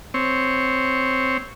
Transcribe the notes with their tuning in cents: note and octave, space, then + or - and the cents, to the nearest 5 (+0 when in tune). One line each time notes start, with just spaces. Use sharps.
C4 +0 C#5 +0